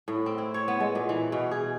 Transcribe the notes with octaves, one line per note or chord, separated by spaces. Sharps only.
A2
C4
E4
C#5
B3
G#3
A#2
E3
B2
G#4